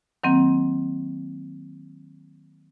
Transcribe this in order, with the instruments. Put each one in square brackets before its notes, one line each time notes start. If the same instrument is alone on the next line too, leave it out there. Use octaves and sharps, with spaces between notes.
[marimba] D#3 F#3 A#3 C4